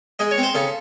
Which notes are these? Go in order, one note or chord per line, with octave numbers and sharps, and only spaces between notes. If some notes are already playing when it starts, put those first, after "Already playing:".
G#3 D#5
C#5
C4
C5
C#3 A4